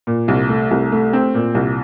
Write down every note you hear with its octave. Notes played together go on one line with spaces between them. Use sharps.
A#2
C2
A3
C2
A3
C4
A#2
C2